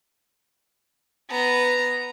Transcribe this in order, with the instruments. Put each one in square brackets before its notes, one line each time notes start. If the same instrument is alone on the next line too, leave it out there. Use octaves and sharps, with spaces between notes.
[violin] B3 A#5